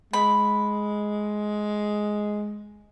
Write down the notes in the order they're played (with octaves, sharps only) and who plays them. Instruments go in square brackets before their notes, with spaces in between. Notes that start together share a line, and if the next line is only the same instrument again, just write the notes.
[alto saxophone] G#3 [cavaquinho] B5